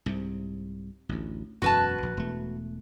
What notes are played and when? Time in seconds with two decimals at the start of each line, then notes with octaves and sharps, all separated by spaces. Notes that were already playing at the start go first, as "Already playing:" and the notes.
0.06 C2 G#2 C3
1.09 A1 D2
1.62 E1 F#2 F#4 B4 A5
2.03 A#1
2.17 E1 A3